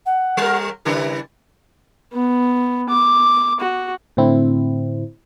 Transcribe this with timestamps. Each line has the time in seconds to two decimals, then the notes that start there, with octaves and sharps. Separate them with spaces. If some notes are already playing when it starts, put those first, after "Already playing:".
0.05 F#5
0.37 G3 A#4
0.85 C#3 G3 E4 B4
2.13 B3
2.89 D6
3.60 F#4
4.17 A2 D3 C4 E4